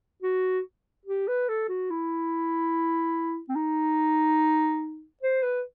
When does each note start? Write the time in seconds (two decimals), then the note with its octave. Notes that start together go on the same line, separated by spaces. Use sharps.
0.23 F#4
1.06 G4
1.28 B4
1.49 A4
1.69 F#4
1.90 E4
3.49 C4
3.56 D#4
5.23 C5
5.43 B4